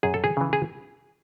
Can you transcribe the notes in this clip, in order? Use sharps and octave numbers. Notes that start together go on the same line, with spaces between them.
F#2 G#4
A4
G#4
C#3 E3
G#4